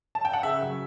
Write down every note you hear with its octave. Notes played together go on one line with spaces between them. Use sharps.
A5
G5
F#5
C#3 E5
F#3